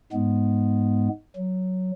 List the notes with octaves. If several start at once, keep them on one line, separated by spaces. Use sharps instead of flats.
G#2 G#3 B3
F#3